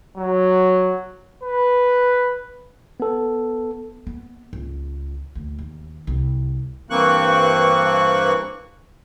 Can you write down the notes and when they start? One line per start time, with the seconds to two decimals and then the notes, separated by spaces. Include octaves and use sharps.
0.17 F#3
1.44 B4
3.00 B3 A4
4.07 B3
4.53 C#2
5.35 D2
5.59 D#2
6.07 C2
6.90 G2 E3 A#3 C4 C#6 F#6